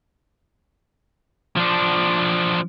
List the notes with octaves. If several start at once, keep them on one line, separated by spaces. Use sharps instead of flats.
F3 D4